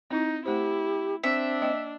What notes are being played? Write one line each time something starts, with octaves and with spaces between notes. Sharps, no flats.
C4 D#4 E4
A3 E4 G4 C5
C4 D4 E5
A#3 D#5 G5